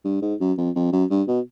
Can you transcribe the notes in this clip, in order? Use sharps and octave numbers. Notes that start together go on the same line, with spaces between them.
G2
G#2
F#2
F2
F2
F#2
G2
B2